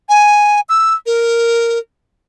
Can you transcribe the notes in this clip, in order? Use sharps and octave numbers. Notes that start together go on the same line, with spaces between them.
G#5
E6
A#4